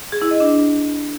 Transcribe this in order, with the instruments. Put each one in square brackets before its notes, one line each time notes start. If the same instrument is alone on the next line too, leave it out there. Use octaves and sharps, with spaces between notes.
[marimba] G#4
E4
D#5
D4